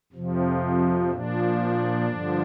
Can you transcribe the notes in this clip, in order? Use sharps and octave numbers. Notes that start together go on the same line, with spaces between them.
F2 C3 F3
A#2 F3 D4
G2 D3 F3